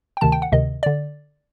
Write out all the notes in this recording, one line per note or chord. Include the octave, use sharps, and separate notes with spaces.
G5
D2 C3 D#3 A5
G5
F#5
D2 C3 D#3 D#5
D3 D5